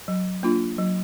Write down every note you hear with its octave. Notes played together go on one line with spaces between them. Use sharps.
F#3
A#3 D4 F4
F#3